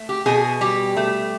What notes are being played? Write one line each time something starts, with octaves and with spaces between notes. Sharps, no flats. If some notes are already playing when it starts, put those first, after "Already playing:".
Already playing: A3
G4
B2 G#4
G3 G4
A3